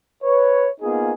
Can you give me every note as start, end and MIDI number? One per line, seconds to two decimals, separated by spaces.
0.22 0.67 71
0.22 0.67 73
0.81 1.12 58
0.81 1.12 59
0.81 1.12 63
0.81 1.12 65
0.81 1.12 68